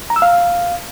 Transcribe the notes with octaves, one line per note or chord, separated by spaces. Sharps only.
A#5
E6
F5